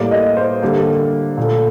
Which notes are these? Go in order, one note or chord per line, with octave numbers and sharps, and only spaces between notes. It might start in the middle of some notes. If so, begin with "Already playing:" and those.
Already playing: A2 G3 A#3 D5
D#5
C5
D3 G3 A#3
A#2 A3